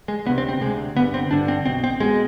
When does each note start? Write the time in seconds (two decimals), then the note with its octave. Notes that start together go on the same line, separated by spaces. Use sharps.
0.08 G#3
0.26 D2 B3
0.30 C3
0.38 C4
0.49 C4
0.61 D2 C3 G#3
0.96 G1 G2 D3 B3
1.14 C4
1.31 G1 G2 D3 D4
1.48 C4
1.66 B1 B2 C4
1.84 C4
2.00 B2 G#3